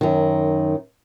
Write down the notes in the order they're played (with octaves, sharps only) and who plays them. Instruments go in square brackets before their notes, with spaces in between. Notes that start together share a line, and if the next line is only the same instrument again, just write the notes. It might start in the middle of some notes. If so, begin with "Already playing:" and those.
[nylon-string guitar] F#2 D#3